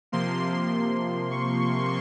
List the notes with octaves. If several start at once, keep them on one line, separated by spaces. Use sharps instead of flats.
C3 F3 A#3 C6
C#6